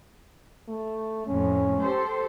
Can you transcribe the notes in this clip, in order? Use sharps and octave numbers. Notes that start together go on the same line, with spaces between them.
A3
F2 A2 C#4
G4 A4 C5